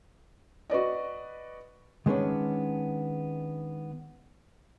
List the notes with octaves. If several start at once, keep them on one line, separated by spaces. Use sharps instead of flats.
F#4 B4 D5 D#5
D#3 G#3 B3 C#4 D4